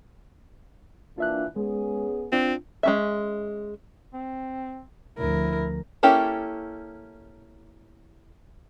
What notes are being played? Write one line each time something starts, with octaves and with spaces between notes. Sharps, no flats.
E3 A#3 D4 F4 E5 F#6
G#3 B3 C#4 G#4
C4 D4 F4
G#3 C#4 E5
C4
D2 F3 E4 A#4
A#3 C#4 E4 G4 A4